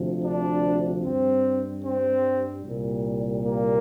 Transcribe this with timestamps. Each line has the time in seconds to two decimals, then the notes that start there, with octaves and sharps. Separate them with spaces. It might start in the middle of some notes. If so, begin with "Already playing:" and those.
Already playing: D2 C3 F3
0.23 D4
1.03 G2 G3 C4
1.84 C4
2.64 C2 A#2 G3
3.44 A#3